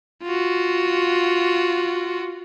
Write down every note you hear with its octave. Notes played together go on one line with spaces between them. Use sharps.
F4 F#4